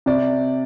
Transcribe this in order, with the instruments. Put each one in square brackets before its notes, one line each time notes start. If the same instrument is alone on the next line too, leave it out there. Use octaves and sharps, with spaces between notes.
[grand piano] C3 [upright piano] D5